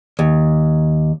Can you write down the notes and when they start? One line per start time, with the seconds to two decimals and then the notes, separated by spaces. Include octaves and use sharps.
0.19 D#2